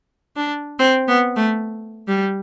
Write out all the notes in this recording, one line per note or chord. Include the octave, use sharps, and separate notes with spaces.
D4
C4
B3
A3
G3